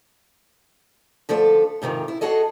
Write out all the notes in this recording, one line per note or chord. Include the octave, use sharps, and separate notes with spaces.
D3 F3 A3 A4
G#2 C3 D#3 F3
E4
F#4 G#4 A4 D#5